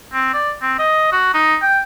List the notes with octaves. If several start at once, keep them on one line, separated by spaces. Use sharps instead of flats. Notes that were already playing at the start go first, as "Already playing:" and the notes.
C4
D5
C4
D#5
F#4
D#4
G5